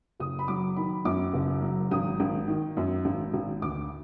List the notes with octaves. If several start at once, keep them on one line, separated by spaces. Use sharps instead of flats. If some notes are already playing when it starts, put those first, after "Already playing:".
F#1 D#6
B5
F#3 D6
D#3 B5
F#2 D6
F#1
F#3
G#1 D#6
G#1
D#3
F#2
G#1
G#1
D2 D6